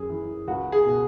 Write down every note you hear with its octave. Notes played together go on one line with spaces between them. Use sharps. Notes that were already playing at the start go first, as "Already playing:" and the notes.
Already playing: F#2 G#4
E3
C#2 F#4
G#4
B2